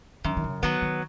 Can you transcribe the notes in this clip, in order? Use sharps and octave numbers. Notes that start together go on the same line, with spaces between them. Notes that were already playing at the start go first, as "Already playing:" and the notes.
F#2 D#3
D#3
C#3
D#3 F#3 B3
D#3